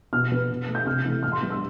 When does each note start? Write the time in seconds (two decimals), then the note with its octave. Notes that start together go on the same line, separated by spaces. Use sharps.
0.13 B2 F6
0.32 B3
0.50 B2
0.68 A3
0.75 G6
0.86 C3 F6
1.04 E3 A3
1.23 A2 F6
1.32 C6
1.42 G3 B3
1.50 E6